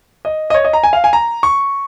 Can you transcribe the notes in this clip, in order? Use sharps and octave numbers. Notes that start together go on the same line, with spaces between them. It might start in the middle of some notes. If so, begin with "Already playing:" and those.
D#5
D#5
C#5
D#5
A#5
G#5
F5
G#5
A#5
C#6